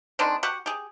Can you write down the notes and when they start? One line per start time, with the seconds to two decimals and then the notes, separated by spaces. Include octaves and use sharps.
0.19 D#3 G#3 C4 D4
0.43 F#4 G4 F#5
0.66 G4 G#4